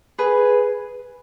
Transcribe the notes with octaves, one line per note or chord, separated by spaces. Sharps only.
G#4 B4